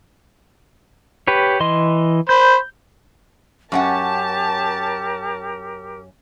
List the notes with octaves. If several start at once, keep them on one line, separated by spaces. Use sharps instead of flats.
G4 B4 C#5
E3 D#5 C6
C5 B5 G6
F#2 C#4 G4 A#4 F#5 A5